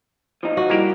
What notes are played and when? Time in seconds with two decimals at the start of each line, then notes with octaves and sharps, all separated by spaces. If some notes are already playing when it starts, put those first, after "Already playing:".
0.43 F3 D#4
0.57 F#4
0.69 G3 A#3 E4 G4 A#4